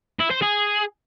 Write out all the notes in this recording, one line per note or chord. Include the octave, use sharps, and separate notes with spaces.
E4
C5
G#4